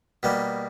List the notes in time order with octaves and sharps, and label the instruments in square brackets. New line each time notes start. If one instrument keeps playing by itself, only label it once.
[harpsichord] B2 G3 A#3